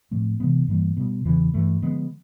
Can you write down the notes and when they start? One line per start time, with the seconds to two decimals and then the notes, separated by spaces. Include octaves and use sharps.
0.11 A2 F3 A3 C4
0.40 C3 E3 G#3 B3
0.68 G2 E3 G3 A#3
0.97 B2 G3 B3
1.25 E2 C#3 E3
1.54 G2 E3 A3
1.82 D3 F3 G#3 B3